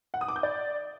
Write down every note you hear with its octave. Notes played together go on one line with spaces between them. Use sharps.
F#5
D#6
D6
G6
D5